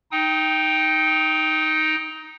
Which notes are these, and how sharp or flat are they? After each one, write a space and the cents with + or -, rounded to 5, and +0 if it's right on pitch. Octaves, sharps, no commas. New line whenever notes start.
D#4 +0 G5 +0 D#6 +30